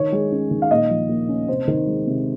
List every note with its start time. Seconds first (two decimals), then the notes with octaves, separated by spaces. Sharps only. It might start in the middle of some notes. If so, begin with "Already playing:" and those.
Already playing: D#3 C#5
0.12 G#3
0.32 C#4
0.51 D#3
0.62 F5
0.71 A#2 D#5
0.90 F3
1.09 A#3
1.29 C#4
1.48 C3 C5
1.68 D#3
1.87 G#3
2.07 C3